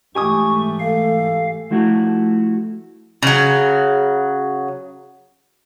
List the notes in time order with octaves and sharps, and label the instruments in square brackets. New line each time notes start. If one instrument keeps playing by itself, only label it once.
[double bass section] G#2 E3 A3 [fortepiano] G4 G#5 D#6 [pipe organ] C#6
[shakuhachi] A4 [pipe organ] F5
[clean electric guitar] F3 A3 E4 F#4
[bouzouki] C#3 F#3